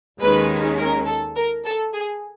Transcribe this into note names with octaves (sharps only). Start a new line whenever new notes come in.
D#2 D#3 G#3 C#4 B4
A#4
A4
A#4
A4
G#4